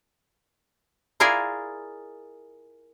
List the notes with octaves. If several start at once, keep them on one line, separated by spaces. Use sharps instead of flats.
E4 F4 G#4 A#4 D5 F5